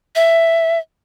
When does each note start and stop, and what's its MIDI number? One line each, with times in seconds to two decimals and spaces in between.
0.16 0.79 76